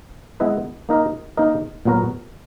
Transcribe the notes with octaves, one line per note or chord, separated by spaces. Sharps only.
G#3 B3 E4 B4 D#5
A#3 D#4 A#4 D#5
A#3 D#4 A#4 D#5
A#2 F#3 B3 F#4 A#4